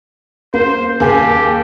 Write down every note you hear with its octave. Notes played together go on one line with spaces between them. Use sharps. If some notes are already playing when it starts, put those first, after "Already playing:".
A#3 C5
D#2 G4 G#4 G#5